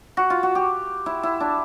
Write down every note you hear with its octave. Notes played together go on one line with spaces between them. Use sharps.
F#4
F4
F#4
G4
E4
E4
D4